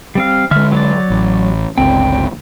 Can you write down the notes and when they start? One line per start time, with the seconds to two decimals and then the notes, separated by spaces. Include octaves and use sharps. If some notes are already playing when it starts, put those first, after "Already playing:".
0.15 G3 C4 F5
0.51 D3 G#3 E5 F6
0.72 F#3 D5
1.10 A1
1.78 G1 C#2 C4 G5